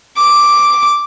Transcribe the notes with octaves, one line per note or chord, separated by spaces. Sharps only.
D6